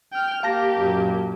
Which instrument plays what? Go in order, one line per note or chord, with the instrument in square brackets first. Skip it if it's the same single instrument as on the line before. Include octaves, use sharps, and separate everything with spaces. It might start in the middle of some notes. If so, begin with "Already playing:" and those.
[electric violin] G5 F6
[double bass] A#3 [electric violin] G4 A#4 [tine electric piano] F5 A5 A#6
[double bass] F#2 A#2